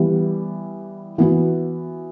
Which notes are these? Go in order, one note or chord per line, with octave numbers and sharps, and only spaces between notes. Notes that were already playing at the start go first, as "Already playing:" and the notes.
Already playing: E3 G3 B3
E3 B3 F#4